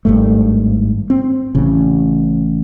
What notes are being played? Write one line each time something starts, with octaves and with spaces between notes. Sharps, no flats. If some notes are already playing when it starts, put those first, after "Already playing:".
G#1 G2 A3
C4
A1 C#3